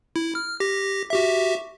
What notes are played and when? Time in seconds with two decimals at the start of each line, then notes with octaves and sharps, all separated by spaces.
0.16 E4
0.35 F6
0.60 G4 A#6
1.10 F#4 G4 E5